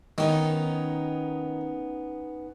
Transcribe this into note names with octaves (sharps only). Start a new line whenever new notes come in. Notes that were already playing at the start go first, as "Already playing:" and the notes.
D#3 B3 C#4 D#4